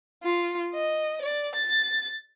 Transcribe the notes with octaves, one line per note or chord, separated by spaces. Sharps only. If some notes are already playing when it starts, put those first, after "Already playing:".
F4
D#5
D5
A6